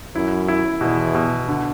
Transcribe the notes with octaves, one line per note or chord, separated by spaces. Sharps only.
F#2 E4
E4
E2 B2
B2
D3